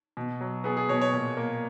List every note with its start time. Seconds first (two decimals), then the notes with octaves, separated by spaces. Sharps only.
0.17 B2
0.41 F#3
0.64 B3 G#4
0.77 G#4
0.89 B2 C#5
1.01 C#5
1.13 A#2
1.37 A#3